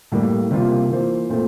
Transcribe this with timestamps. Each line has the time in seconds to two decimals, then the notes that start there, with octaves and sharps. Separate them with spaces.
0.12 A2 G3 A#3
0.51 C3 G3 A#3 F4
0.90 E3 A#3 F4 C5
1.29 A#2 A3 C4 F4